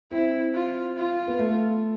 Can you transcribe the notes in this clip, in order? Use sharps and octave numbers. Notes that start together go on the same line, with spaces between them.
C4 E4
F4
F4
B3
A3